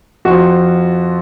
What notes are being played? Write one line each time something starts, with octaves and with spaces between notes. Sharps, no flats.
F2 F3 F#4